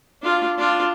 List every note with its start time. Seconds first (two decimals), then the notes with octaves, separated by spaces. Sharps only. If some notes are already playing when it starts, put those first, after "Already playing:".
0.22 D4 F4
0.58 D4 F4